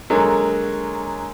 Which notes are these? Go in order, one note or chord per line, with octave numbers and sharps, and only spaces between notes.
D3 F#3 G#3 A#3 A4 A#4